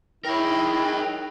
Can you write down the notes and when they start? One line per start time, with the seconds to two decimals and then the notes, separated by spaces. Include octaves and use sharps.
0.25 D#4 E4 G#4 A#4 C#5 G5